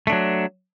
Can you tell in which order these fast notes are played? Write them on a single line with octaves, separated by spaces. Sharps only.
A3 D4 F#3